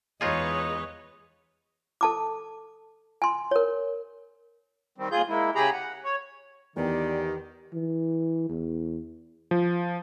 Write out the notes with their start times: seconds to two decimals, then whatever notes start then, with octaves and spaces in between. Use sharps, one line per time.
0.21 E2 G#3 D#4 F4 G#4 B4 C#5 D#5
2.01 A4 A5 D6
3.22 G#5 C6
3.51 A#4 C#5
4.98 D#3 G3 C4
5.11 D#2 F4 G#4 G6
5.29 G#3 A#3 E4
5.55 C#3 G4 G#4 A#5 B5
5.73 F#5
6.04 C#5
6.76 E2 D#3 G4 D5
7.74 E3
8.49 E2
9.51 F3